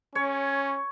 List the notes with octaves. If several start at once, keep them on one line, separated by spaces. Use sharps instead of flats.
C#4 C#5